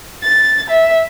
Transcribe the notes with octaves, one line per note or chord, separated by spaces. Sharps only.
A6
E5